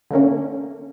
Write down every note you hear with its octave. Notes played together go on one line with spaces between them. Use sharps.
D3 A3 A#3 C#4